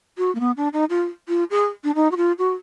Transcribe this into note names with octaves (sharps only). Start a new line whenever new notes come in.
F#4
A#3
B3
D4
D#4
F4
F4
G#4
D4
D#4
F#4
F4
F#4